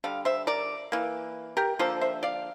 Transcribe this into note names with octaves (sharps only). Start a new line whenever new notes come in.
D3 G3 F5
C5 E5
A#4 D5
E3 A#3
G4 A#4
D3 F3 A#3 A4 C5
C5 E5
D5 F5